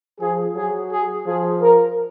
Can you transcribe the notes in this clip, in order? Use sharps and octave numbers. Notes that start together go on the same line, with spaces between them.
F3 G#4
F#3 G#4
G#4
F3 G#4
A#4